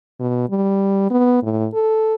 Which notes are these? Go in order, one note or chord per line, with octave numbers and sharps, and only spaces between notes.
B2
G3
B3
A2
A4